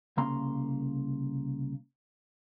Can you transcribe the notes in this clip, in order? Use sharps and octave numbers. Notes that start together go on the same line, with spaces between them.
C2 C#3 A#3 A#5 C6